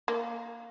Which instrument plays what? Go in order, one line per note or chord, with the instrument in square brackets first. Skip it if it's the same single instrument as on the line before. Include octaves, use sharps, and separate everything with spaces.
[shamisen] A#3